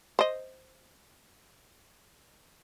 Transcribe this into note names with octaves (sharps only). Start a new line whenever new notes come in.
C5 D#5